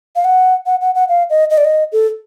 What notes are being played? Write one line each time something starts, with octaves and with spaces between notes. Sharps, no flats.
F5
F#5
F#5
F#5
F#5
F5
D#5
D#5
D5
D#5
A4